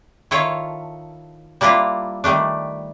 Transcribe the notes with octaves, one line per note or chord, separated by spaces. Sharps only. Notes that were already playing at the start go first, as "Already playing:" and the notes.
D#3 E4 F4 A4 C#5
G3 A#3 D4 E4 F4
D#3 G3 A3 D4